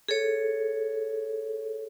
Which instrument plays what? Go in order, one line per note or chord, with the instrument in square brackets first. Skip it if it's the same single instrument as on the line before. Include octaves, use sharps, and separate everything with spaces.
[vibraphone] G#4 A4 C#5